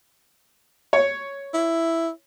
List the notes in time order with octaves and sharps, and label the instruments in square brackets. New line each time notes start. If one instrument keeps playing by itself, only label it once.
[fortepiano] C#5
[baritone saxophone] E4